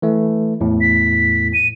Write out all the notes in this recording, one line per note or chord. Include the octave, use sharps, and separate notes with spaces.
E3 A3
E2 A2
B6
D#7